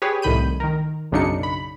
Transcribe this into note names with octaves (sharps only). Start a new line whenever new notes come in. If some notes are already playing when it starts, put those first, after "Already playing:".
G4 G#4 B4 C#5
C2 A2 D#3 B5 G6 D#7
D#3 A#4
B1 F#2 C#3 D4 D#4 C#7
B5